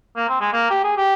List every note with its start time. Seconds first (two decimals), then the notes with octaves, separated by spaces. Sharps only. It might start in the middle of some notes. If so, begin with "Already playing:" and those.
0.16 A#3
0.29 C4
0.40 G#3
0.53 A#3
0.70 G4
0.84 G#4
0.97 G4